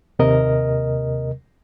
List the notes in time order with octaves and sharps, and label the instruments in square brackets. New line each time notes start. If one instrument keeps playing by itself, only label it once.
[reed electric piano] D#2 C3 A#4 D#5